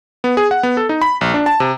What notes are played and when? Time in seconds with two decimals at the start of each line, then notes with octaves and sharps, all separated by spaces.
0.24 B3
0.37 G#4
0.51 F#5
0.63 B3
0.77 A4
0.89 D#4
1.02 B5
1.21 A#1
1.34 D4
1.46 A5
1.60 C3